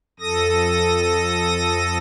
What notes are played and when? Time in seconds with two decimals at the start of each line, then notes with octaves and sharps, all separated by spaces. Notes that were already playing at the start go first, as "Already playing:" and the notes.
0.20 F2 A4 D#6 A#6